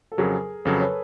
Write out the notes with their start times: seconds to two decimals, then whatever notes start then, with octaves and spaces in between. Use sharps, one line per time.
0.12 A4
0.17 F2 C#3 F#3 G#4 A#4
0.65 F2 C#3 F#3 A4 B4
0.80 B4 C#5